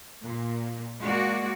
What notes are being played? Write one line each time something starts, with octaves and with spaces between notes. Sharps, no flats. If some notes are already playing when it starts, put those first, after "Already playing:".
A#2
G#3 A#3 F#4 D5